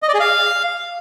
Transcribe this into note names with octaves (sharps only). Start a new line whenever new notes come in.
D#5
D5
G#4
F5